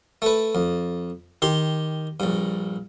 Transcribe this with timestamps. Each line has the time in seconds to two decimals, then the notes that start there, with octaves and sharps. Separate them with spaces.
0.22 A3 B4
0.55 F2
1.42 D#3 G4 C6
2.20 A#1 G2